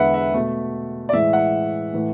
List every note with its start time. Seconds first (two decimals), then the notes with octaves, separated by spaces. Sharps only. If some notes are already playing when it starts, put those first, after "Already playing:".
Already playing: E2 D3 G#3 B4 E5 F#5
0.14 E5
0.34 B2 A3
1.09 D5
1.13 A2 E3 G#3 E5
1.33 F#5
1.93 A2 E3 A3